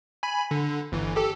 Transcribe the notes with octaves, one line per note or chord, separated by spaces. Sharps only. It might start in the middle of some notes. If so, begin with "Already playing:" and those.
G#5 B5
D3
G1 E3
G4 A4